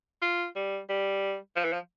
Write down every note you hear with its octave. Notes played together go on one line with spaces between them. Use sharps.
F4
G3
G3
F3
E3
F3